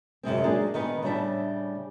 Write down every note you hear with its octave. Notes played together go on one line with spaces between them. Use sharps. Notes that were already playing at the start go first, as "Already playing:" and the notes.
F#2 C3 G#3 C4
F#3 G#3 A#3 D4 D#4 G#4
D#3 B3 B4
A2 C#3 G3 D4 E5 A5